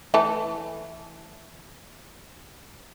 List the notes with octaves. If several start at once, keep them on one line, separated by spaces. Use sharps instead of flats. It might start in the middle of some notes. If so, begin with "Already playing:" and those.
E3 A3 A4